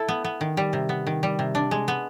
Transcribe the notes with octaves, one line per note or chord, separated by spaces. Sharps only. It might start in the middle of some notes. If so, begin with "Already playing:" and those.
Already playing: E4 A4
B3
B3
D#3
G3
C3
B3
D#3
G3
C3
D4
G#3
B3